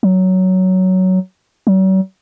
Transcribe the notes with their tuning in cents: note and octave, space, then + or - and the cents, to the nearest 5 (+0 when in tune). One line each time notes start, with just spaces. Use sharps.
F#3 +10
F#3 +45